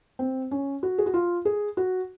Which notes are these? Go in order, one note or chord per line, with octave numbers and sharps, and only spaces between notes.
C4
C#4
F#4
G#4
F#4
F4
G#4
F#4